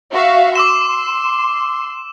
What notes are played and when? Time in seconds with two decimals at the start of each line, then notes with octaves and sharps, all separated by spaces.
0.13 F#4 E5 F5
0.55 C6 D6 E6 E7